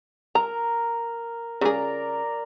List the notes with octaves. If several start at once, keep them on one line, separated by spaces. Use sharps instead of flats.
A#4 A#5
C#3 G#4 A#4 D5 A#5